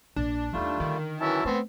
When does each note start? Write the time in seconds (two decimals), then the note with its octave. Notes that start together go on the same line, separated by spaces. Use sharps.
0.16 A#1 D4 D5
0.53 D#2 D#3 G3 A3 F4
0.80 D3 D#3
1.20 E3 F#3 C#4 E4 A5
1.45 A3 B3 C4